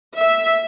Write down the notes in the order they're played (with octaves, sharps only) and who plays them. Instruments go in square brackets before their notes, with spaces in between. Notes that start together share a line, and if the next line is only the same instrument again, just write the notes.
[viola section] E5